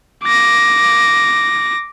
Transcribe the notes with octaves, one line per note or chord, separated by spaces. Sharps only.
D6 A#6